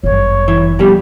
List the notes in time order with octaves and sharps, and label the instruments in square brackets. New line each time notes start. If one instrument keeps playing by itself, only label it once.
[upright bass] G1 F#2 [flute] C#5
[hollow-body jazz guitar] E3
[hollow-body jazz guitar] F2 B2 G3 [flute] G4